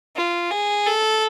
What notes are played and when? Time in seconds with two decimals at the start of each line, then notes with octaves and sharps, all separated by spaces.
0.16 F4
0.51 G#4
0.86 A4